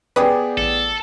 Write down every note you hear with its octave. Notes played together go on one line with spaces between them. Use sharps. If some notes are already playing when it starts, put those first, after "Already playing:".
B3 G4 G#4 B4 D5 G5 D6 D#6
A1 A4